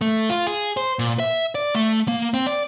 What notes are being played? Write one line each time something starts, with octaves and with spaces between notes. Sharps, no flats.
A3
F4
G#4
C5
A#2
E5
D5
A3
A#3
C4
D5